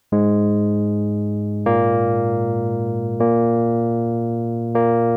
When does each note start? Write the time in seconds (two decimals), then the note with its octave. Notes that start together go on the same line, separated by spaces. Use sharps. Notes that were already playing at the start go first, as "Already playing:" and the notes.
0.12 G#2 G#3
1.66 A#2 A#3
3.20 A#2 A#3
4.75 A#2 A#3